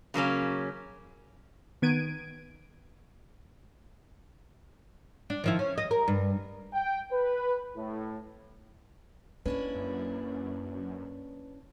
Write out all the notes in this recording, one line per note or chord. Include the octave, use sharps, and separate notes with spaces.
C#3 F#3 A#3 C#4
D#3 B3 G#6 D7 D#7
D4
D#3 F3 E4
C#4
D#5
A#4
G2
G5
B4
A2
A#3 C#4 D4 E4 B4
F#2